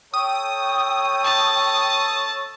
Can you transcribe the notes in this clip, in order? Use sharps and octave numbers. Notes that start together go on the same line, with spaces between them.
A4 C#5 G5 D#6
A5